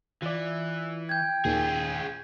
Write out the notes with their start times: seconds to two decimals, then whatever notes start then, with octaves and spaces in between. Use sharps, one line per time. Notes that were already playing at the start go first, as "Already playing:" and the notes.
0.22 E3 F4 D5
1.09 G5 G6 G#6
1.45 D#2 A#2 D#3 F4 G#4